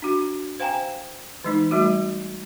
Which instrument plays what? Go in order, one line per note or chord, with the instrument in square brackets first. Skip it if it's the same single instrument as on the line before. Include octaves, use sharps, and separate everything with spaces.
[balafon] D4 F#4
C5 F5 G5 G#5 A#5
E3 G#3 D#4
G3 A3 F#4